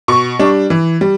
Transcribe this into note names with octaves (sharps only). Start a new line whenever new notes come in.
B2 C#6
G3 D4
E3
G3